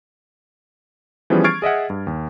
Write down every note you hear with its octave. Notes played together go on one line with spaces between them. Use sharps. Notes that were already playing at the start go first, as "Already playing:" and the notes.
E3 F3 G3 B3 C#4 G#4
C#6 F6 G#6 A6 C7 D7
G#4 D#5 E5 F#5
G2
D#2